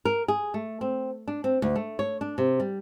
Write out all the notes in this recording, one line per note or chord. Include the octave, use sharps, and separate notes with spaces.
A#4
G#4
A3
C4
D4
C4
D2
A3
C#5
D4
C3
G3